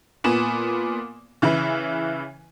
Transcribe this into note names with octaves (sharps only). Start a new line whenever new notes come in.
A#2 B3 G#5 E7
C#3 E3 E4 B4